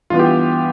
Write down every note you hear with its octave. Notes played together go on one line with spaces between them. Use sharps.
G2 E3 B3 F4
G4